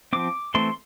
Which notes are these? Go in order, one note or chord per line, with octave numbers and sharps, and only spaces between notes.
F3 C4 D6
E3 A3 C4 C6